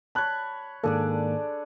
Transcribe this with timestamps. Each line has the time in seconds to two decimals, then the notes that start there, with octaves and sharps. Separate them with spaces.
0.15 C#5 A5 B5 F#6
0.84 G#2 D#3 A#3 D4 G#4 A4 D5